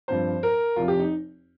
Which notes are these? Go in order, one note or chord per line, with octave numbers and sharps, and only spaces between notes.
G2 F3 C4 C5
A#4
F1 F2 C3 F4
G4
D#4